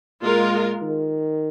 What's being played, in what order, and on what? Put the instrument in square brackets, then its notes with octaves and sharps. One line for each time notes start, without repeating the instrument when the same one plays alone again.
[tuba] A#2 [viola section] G#3 F4 A#4
[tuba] D#3